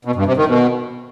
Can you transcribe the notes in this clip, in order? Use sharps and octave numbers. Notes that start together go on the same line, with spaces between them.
B2
G2
C3
D#3
B2